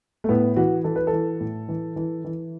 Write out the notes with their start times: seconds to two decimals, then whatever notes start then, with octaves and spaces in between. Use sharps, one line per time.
0.24 A3
0.29 A2 B3
0.56 E3 F#4
0.84 E3 A4
0.96 B4
1.07 A4
1.13 E3
1.40 A2
1.68 E3
1.96 E3
2.25 E3